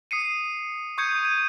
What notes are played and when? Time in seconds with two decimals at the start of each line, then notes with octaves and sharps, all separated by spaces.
0.11 D#6 C7 C#7 D#7
0.98 C#6 D#6 G6 G#6 C#7 D#7
1.25 D#7